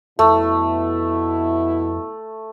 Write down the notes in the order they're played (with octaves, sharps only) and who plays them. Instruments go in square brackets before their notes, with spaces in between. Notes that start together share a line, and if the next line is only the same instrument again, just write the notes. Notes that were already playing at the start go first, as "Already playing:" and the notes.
[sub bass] F2 [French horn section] B2 B3 E4 [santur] A3